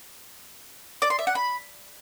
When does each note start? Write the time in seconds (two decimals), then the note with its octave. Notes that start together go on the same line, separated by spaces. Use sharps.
1.02 D5
1.10 C6
1.19 E5
1.27 F#5
1.35 B5